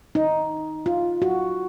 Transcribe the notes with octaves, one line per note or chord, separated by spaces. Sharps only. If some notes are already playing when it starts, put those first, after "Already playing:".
D#4
F4
F#4